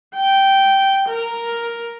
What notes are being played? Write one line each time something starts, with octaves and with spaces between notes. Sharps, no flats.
G5
A#4